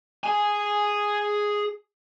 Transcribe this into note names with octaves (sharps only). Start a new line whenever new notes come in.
G#4 G#5